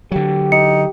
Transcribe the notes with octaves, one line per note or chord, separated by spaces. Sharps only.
D3 F#3 G4
D#4 C#7